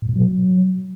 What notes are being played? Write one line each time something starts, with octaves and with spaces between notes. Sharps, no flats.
A2
B2
F#3